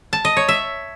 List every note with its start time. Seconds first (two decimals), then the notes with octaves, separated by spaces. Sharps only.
0.13 A5
0.25 D#5
0.37 C#5
0.49 E5